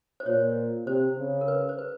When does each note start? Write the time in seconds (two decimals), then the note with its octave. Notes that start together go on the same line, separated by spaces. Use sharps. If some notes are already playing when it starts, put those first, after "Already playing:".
0.20 C5
0.26 A#2 C#5
0.86 C3 C5
1.18 C#3
1.41 A#4
1.48 B4
1.69 C5
1.79 B4